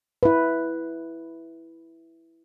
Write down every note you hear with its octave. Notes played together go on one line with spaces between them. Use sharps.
E4 B4